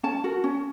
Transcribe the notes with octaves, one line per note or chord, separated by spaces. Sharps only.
C#4 A5
F#4 A#4
C#4